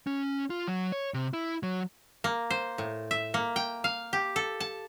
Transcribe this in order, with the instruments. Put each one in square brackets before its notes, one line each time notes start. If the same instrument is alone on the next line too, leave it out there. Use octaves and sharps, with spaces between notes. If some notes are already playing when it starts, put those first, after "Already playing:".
[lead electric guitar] C#4
F4
F#3
C#5
C3
E4
F#3
[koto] A#3
C5
A2
E5
A#3
G5
F5
G4
A4
A5